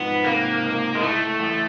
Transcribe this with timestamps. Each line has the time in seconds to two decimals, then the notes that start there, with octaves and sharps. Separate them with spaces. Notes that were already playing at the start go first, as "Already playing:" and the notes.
Already playing: B1 G#2 F3 B3
0.25 C3 A#3
0.62 C#2
0.95 G#3
1.01 A2 A3
1.40 A1